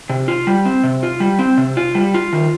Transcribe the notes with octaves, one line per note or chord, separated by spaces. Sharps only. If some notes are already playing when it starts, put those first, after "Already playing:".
C3
F4
G3
C4
C3
F4
G3
C4
C3
F4
G3
F4
D#3